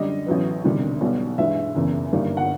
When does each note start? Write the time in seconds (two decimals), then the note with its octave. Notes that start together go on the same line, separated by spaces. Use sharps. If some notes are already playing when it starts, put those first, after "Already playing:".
Already playing: F#2 D3 G3 D#5
0.26 A1 A2 F#3 B3
0.64 E1 D2 C3 D#3 G3
1.01 B1 B2 G3
1.38 G2 E3 G#3 E5
1.75 F#1 E2 C#3
2.12 G1 G2 D#3 G3 A#3
2.37 F#5